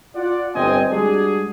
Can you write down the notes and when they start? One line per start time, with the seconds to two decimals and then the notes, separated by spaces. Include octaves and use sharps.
0.15 F4 D5 F#5
0.55 G1 C4 D#5 G#5
0.91 G3 G#3 D4 F#4 G#4